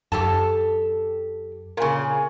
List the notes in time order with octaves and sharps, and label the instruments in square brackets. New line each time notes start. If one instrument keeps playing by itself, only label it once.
[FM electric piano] F#2 [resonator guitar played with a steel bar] G4 A4 A5
[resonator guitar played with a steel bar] A#2 C#3 [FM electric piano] A#4 G#5